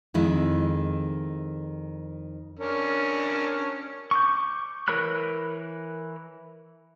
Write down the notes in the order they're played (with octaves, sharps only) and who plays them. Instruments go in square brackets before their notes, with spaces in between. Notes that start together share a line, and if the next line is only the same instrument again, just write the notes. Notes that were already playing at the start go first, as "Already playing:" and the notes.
[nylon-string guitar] F2 D#3 G#3 E4
[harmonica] C#4 D4 A#4
[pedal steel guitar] C#6 D6 G6
E3 A#4 C#5 B5 F#6